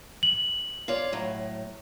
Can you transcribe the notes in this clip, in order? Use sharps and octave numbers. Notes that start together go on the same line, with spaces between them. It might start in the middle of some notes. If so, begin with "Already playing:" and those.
F#7
F4 C#5 D5
A2 F#3